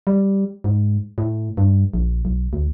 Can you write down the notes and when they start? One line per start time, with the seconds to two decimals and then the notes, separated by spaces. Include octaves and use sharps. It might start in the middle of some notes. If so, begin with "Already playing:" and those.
0.07 G3
0.64 G#2
1.18 A2
1.57 G2
1.94 A#1
2.25 B1
2.53 D2